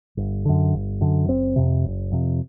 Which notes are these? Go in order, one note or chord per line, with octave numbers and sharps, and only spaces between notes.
G1
F#2 D3
G1
F#2 D3
F#1 C4
F2 C3
F#1
F2 C3